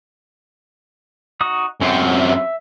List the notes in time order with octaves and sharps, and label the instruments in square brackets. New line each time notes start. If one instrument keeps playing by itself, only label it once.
[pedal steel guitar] D#4 F#4 D#6
[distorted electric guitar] F#2 C4 [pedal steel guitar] C#4 F#5
[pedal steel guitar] E5